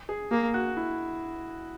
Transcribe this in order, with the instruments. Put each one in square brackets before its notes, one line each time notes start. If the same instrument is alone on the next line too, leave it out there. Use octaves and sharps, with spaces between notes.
[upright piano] G#4
[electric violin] A#3 [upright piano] G#4
[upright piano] F#4
E4